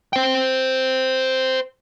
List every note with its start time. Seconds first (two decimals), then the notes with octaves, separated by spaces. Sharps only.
0.13 C5 G5